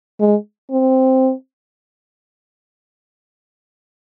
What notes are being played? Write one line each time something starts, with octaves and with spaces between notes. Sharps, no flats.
G#3
C4